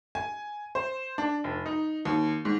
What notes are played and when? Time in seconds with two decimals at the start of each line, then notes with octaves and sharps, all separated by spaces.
0.15 G#5
0.75 C5
1.18 D4
1.44 F1
1.66 D#4
2.05 D#2
2.45 G#2